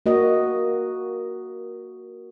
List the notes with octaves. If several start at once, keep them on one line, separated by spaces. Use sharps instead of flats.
A#3 F#4 D#5